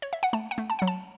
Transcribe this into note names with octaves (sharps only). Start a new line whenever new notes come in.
C#5
E5
F#5
A3 A5
F#5
A3
A5
F#3 F#5
A5